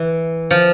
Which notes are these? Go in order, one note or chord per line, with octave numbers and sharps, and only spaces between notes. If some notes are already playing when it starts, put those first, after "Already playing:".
Already playing: E3
F3